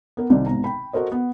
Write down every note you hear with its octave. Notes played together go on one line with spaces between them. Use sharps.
B3 A#4
C2 C3 D#3 D5
G#1 B2 A#5
G5 B5
F#4 A4 A#4 C5 D#5
B3